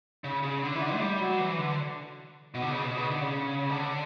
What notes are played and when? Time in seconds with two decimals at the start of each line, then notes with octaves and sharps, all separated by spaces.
0.24 C#3
0.43 C#3
0.63 D3
0.75 E3
0.82 D3
0.94 A3
1.01 G3
1.19 F#3
1.39 E3
1.58 D3
2.54 B2
2.62 D3
2.69 C#3
2.83 B2
2.98 C#3
3.10 D3
3.21 C#3
3.69 D3